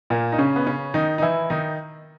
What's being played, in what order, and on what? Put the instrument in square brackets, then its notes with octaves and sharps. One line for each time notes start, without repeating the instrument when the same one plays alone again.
[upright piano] A#2 A#3
D#4
C#3 C#4
B3
C#3 C#4
D#3 D#4
D#4
E3 E4
D#3 D#4